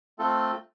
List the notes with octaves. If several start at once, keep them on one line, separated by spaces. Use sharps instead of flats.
A3 C4 F4 A4